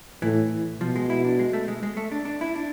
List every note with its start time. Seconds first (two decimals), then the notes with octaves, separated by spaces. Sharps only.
0.22 A2 E3
0.81 B2 F3
0.96 G#3
1.10 E4
1.25 D4
1.39 G#3
1.53 A3
1.68 G#3
1.83 G#3
1.97 A3
2.12 D4
2.25 D4
2.41 E4
2.55 D4